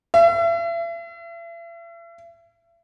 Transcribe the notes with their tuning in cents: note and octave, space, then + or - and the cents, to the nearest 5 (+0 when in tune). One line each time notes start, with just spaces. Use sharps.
E5 +40